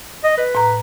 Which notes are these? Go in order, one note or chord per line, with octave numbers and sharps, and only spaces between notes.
D#5
B4
A2 A#5